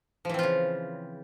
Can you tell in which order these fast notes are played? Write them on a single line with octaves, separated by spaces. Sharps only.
F3 E3 C4 F4 C#3